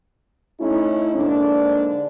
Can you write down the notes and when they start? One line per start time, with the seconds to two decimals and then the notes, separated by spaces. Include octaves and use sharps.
0.60 A3 C#4 D#4 E4
1.16 G#2 D3 A#3 D4